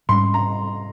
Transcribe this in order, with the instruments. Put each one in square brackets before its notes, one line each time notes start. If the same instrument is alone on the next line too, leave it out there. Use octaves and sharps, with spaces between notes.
[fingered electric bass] G#2 G3 C#4 [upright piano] C6
[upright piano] A#5